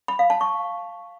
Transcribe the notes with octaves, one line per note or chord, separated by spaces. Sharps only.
B5
F5
A5
C#6